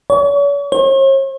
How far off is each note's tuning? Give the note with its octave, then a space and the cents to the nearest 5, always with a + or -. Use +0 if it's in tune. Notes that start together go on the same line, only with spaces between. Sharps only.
C#5 +40
C#5 -45